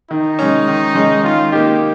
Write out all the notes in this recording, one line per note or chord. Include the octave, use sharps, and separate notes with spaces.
D#3 D#4
G#3 C#4
D#3
G#3 C#4
D#3 F4
A#3 D#4 G4